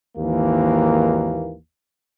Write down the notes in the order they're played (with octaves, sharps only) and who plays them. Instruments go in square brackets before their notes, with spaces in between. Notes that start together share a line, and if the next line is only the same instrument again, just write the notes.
[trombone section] G#1 D#2 E3 A#3